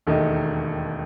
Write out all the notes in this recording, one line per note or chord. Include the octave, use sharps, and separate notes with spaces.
E1 D#2 D#3 A3 D#4